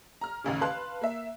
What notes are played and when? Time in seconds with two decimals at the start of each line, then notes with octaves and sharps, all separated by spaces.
0.21 A#5 F6
0.44 A1 D#2 C#3
0.61 B4 F5 A5 C6 F#6
1.01 A#3 E5